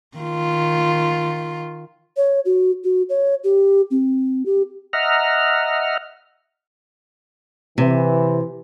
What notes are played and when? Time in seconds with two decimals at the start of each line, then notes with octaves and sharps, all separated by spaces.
0.18 D#3 F4
2.17 C#5
2.45 F#4
2.84 F#4
3.09 C#5
3.44 G4
3.91 C4
4.46 G4
4.93 D#5 E5 F#5 A#5 F6
7.78 C3 E3